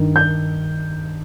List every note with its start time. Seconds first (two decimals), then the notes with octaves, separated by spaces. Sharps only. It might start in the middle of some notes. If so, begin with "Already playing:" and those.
Already playing: G2 D#3
0.16 G6